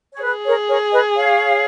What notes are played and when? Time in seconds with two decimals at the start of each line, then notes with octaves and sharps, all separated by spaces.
0.14 C#5
0.23 G#4 B4
0.46 A#4 C#5
0.69 A#4 C#5
0.92 B4 D#5
1.16 C#5 F5